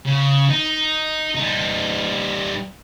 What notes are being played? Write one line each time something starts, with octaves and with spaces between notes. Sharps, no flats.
C#3
D#4
G3 D#4